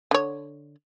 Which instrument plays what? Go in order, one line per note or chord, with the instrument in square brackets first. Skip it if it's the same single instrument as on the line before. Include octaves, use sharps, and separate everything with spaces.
[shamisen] D3 C#5